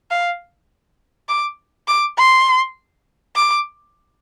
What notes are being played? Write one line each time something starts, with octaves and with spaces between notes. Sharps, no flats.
F5
D6
D6
C6
D6